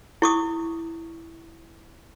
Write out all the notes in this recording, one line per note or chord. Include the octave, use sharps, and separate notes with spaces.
E4 C#6 D#6